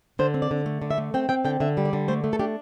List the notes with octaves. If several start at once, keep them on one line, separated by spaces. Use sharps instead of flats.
D3 C5
C4
D5
D3
A3
D3
E5
A3
C4 G5
C4 G5
D3 G5
D3 E5
G3
D5
D3
A3 C5
A3
A4
D4 G4